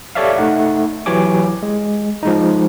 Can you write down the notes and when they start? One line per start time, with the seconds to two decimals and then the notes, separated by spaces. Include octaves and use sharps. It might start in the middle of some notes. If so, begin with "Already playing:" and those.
0.15 G4 A4 C#5 D5 E5 F5
0.38 A3 D#4 F#5
1.06 E3 F#3 G4 C#5 G#5 D6
1.63 G#3
2.23 F3 G#3 D#4